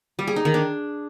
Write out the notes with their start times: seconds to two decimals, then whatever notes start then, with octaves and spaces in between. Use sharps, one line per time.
0.19 G3
0.27 G#4
0.36 D#4
0.45 D#3
0.54 D4